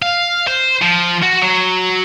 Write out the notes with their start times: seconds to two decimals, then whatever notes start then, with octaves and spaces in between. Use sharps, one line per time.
0.02 F5
0.48 C5
0.82 F3
1.22 F#4
1.42 F#3